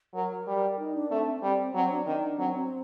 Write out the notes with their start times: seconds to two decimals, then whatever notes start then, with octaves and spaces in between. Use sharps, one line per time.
0.14 F#3 A#4
0.47 G3
0.79 D#4
0.95 D4
1.11 A3 C4
1.42 G3 C4
1.74 F#3 C4
1.90 D4
2.06 D#3 D4
2.38 F#3 C4
2.54 C4